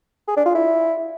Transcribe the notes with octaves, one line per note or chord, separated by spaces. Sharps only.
G#4
D4
F4
E4